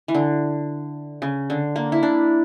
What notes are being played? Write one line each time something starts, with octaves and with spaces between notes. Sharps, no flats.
E3
D3
C#3
D3
A#3
E4
D4